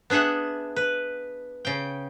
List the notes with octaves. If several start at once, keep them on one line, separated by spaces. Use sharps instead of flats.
B3 D4 G#4 E5 F#5
B4
C#3 G5